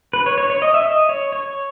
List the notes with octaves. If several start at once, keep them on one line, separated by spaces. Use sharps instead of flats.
B4
C#5
C#5
C#5
D#5
E5
D#5
C#5
C#5